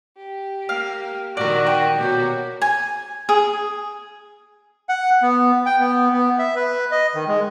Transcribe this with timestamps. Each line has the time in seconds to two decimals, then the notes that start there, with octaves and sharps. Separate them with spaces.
0.17 G4
0.69 A#3 F5
1.37 A#2 D#3 F#4 A#4 D5
1.67 G5
1.99 B2 A#3 F#4 G4 C#5
2.62 G#5
3.29 G#4
4.89 F#5
5.22 B3
5.66 G5
5.79 B3
6.13 B3
6.39 E5
6.56 B4
6.91 D#5
7.15 D#3
7.28 G#3